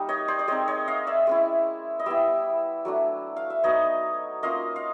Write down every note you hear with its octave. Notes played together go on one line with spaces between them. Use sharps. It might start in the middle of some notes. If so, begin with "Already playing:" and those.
Already playing: G3 A#3 D#4
C#5 D#5
C5 D5
D5
G#3 C4 D#4 C#5 D#5
C#5 D#5
D#5 F5
D5 E5
G#3 C#4 E4
D#5
G3 B3 E4 D5 E5
F#3 A3 D4
F5
E5
F#3 B3 D#4 C#5 D#5
A#3 C#4 F4 D#5 F5
F5